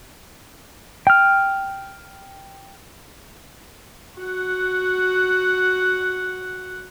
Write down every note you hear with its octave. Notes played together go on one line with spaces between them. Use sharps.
G5 F6
F#4 F#5